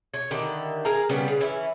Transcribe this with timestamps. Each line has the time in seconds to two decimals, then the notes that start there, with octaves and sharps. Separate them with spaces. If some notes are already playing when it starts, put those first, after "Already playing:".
0.14 C#5
0.31 D3 D#3 E4 G4
0.85 G#4 A#4 F5 A#5
1.09 C#3 G3 B3 C#4
1.28 C#3
1.41 E3 C#4 E4